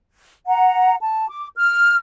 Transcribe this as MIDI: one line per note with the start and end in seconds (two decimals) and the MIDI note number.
0.47 0.95 78
0.47 0.95 82
1.00 1.27 81
1.30 1.48 86
1.56 1.97 89